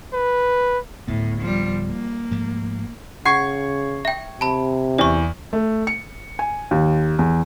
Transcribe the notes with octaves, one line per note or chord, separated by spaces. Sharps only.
B4
D1 A2 B3
F3 G3
A#3
G#2 F3 A3
C#3 F#5 C#6 G#6 C7
E5 G5
C3 A5 B5
E2 D5 C#6
A3
C#7
G#5
D#2
E2